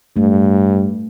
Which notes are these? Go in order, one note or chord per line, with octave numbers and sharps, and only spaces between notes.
G2 A3